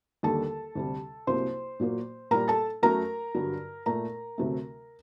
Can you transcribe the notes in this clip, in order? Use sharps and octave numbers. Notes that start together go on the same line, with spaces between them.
D#2 D3 G3 A#3 A4 A5
D2 C3 G3
C2 C3 F#3 A#3 C5 C6
A#2 F#3 A#3
A#2 G3 A#3 A#4 A#5
A4 A5
F#2 F#3 A3 A#4 A#5
G2 D3 F#3
A#2 A3 A#4 A#5
D2 C3 F#3 A3